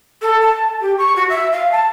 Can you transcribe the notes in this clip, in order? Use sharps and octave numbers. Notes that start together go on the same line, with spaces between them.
A4
A5
G4
C#6
F#4
E5
F5
A5